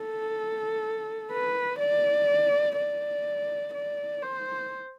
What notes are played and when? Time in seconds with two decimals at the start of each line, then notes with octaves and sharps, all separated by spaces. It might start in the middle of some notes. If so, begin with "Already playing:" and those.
Already playing: A4
1.31 B4
1.79 D5
2.77 D5
3.74 D5
4.22 C5